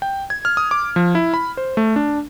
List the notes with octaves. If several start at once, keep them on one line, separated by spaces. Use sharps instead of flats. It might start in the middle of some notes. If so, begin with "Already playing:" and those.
G5
G#6
F6
D#6
D6
F3
E4
B5
C5
A3
D4